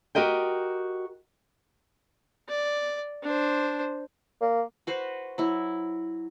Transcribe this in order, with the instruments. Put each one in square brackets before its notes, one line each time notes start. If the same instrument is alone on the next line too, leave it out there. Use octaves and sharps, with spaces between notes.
[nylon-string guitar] F#4 G4 A#4 D#5 G5
[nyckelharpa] D5
D4 C5
[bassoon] A#3
[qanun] F#4 B4 C5
F#3 E4